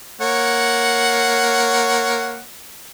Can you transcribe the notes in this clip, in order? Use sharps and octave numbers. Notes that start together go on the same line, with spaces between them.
A#3 C#5 F#5